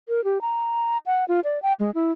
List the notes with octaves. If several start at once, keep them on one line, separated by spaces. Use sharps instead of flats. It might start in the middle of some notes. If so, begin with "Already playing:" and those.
A#4
G4
A#5
F#5
F4
D5
G5
G#3
E4